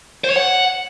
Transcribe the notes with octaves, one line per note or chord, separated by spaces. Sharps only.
C5
C#5
F#5